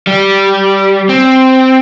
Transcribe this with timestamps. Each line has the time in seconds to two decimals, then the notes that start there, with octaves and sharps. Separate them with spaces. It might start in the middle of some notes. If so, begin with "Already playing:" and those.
0.07 G3
1.09 C4